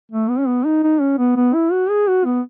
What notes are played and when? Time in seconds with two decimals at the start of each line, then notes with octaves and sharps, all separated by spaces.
0.12 A3
0.29 B3
0.39 C#4
0.47 B3
0.65 D#4
0.83 D#4
1.00 C#4
1.18 B3
1.36 B3
1.54 E4
1.72 F#4
1.90 G#4
2.08 F#4
2.25 B3